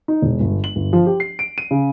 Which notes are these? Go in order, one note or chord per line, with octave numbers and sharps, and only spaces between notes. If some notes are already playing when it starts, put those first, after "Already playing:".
D#4
E1
G1
F#7
G1
F3
G4
C7
D7
D#7
C#3